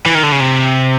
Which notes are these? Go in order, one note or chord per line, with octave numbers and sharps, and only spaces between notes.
E3
D#3
D3
C#3
C3